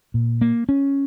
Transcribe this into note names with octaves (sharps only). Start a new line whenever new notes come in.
A#2
A#3
C#4